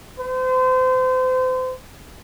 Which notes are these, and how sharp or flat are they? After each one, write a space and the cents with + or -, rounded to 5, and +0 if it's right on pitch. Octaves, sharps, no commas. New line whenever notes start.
C5 -35